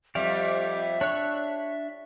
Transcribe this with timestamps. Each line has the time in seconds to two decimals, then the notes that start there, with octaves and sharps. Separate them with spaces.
0.15 F2 G3 G4 D5 E5 F5
1.01 D4 C#5 F#6